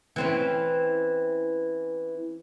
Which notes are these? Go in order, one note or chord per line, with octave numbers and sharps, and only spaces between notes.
E3 C4 C#4